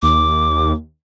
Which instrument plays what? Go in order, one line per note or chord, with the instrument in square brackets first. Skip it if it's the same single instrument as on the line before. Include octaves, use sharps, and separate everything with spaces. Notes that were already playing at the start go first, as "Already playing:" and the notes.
[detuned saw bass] D#2 [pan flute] D6